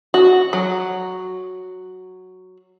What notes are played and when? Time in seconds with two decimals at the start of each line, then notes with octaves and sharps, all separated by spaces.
0.14 F#4
0.53 F#3